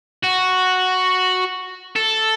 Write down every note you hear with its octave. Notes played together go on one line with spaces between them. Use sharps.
F#4
A4